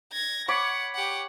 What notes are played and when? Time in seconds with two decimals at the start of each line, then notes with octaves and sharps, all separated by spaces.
0.13 G#6 A#6
0.48 C#5 F#5 B5 D6
0.95 G4 F#5